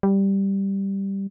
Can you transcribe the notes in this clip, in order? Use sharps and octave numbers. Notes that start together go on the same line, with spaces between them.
G3